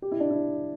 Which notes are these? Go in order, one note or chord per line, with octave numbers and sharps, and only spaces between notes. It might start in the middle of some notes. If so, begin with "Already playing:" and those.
G4
E4
D4
E4